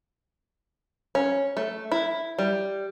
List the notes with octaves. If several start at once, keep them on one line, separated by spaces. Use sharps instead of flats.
C#4
A3
E4
G3